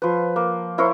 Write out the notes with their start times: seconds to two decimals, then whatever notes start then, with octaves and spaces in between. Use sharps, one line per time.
0.02 F3 B4
0.36 A#3
0.78 E4 A#4 C5 C#5